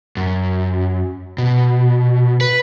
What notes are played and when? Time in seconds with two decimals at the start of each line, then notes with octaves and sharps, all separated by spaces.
0.17 F#2
1.38 B2
2.41 B4